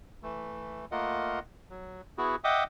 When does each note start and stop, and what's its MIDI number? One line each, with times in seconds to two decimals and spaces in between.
0.23 0.85 52
0.23 0.85 57
0.92 1.39 57
0.92 1.39 58
0.92 1.39 65
0.92 1.39 70
0.92 1.39 75
0.92 1.39 78
1.70 2.01 54
2.18 2.36 59
2.18 2.36 64
2.18 2.36 66
2.18 2.36 68
2.44 2.64 75
2.44 2.64 76
2.44 2.64 78
2.44 2.64 79
2.44 2.64 86
2.44 2.64 87